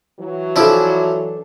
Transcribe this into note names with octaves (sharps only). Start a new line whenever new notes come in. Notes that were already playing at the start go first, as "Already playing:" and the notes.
E3 F#3
F3 D4 E4 A4